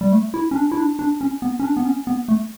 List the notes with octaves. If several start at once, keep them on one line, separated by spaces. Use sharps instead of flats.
G3
A3
E4
C#4
D4
E4
D4
D4
C#4
B3
C#4
D4
B3
C#4
B3
A3